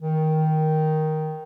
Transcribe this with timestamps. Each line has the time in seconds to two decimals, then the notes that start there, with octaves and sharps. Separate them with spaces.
0.01 D#3